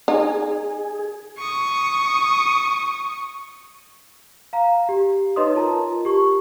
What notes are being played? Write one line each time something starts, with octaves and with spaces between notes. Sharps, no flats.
D#4 G#4
C#6 D#6
F5 A#5
G4
D#4 B4 C#5 D#5 C6 D#6
F4 A#4 A5 A#5
G4 C#6